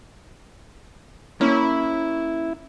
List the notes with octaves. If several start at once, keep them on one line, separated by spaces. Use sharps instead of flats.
A#3 C#4 E4 C#5